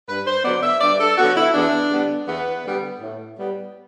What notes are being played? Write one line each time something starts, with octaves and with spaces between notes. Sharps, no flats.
G2 B4
C5
D3 F#3 B3 D5
E5
G2 D5
A4
D3 F#3 B3 F#4
E4
E2 D4
D3 G3 B3
E2 B3
D3 G3 B3
A2
G3 B3